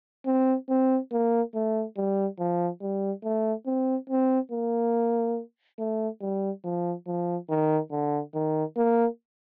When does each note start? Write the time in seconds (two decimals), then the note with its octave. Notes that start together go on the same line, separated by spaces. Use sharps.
0.26 C4
0.69 C4
1.12 A#3
1.55 A3
1.97 G3
2.39 F3
2.82 G3
3.24 A3
3.67 C4
4.10 C4
4.52 A#3
5.79 A3
6.21 G3
6.64 F3
7.07 F3
7.49 D#3
7.91 D3
8.35 D#3
8.77 A#3